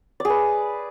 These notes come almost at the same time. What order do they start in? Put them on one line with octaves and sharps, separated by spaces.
D5 G#4 B4